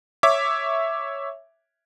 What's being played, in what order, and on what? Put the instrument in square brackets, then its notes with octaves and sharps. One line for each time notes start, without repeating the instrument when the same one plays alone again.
[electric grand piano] C#5 E5 D6